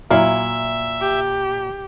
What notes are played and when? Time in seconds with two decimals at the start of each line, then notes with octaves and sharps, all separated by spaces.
0.11 A#2 F#3 E4 E5 F5
1.01 G4